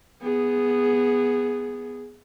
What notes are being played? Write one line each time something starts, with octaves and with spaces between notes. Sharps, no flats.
B3 G#4